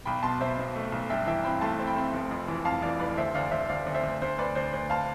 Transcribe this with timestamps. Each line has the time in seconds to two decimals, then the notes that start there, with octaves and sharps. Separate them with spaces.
0.05 B1 G5 B5
0.23 B2 A5 C6
0.40 B2 C5 E5
0.58 B2
0.76 A3
0.92 B1
1.10 G2 E5 G5
1.26 E3 E5 G5
1.44 C4 G5 B5
1.61 A3 A5 C6
1.80 C4
1.87 G5 B5
1.96 C4
2.14 F1
2.31 F2
2.48 E3
2.65 F2 F5 A5
2.82 E3 D5 F5
3.00 F1 B4 D5
3.17 D2 C5 E5
3.35 D2 D5 F5
3.51 D2 C5 E5
3.69 D2 D5 F5
3.87 D2
3.95 C5 E5
4.03 D2
4.22 D2 C5
4.38 D2 B4 D5
4.55 D2 C5
4.73 D2 C5
4.90 F5 A5